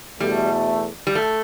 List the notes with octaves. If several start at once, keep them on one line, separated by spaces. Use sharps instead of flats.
E2 B2 G3 A3
G3
A3